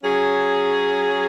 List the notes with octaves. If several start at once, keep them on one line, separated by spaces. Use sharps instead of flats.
F#3 C#4 G#4